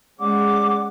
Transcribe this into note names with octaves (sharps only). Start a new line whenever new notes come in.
G#3 C#4 D5 F#5 D6